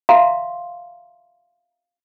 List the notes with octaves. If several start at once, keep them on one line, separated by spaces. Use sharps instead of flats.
E5 F5 A#5 C6